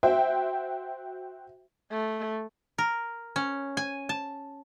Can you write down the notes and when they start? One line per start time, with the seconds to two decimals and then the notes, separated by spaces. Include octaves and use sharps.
0.03 F#4 C5 E5 G5
1.92 A3
2.78 A#4
3.36 C#4
3.77 G#5
4.09 A5